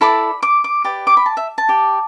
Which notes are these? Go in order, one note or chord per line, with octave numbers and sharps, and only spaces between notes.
E4 A4 D5 B5
D6
D6
G4 B4 D5
D6
B5
A5
E5
A5
G4 D5